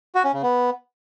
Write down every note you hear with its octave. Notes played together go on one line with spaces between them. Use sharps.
F#4
C#4
C#3
B3